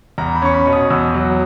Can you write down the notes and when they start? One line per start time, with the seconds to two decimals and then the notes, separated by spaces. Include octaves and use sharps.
0.18 E2 A#5
0.35 B5
0.42 C#4 C#6
0.54 B5
0.67 B2
0.73 D#6
0.90 E2 E6
1.14 F#3